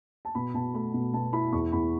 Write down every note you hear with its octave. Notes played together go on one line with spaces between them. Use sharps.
A5
B2 B5
B2 A5
A3 B5
B2
B2 A5
E4 B5
E2 C#6
E2 B5